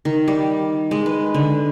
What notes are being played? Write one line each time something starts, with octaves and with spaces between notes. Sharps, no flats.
D#3
G3
G#3
B4
D3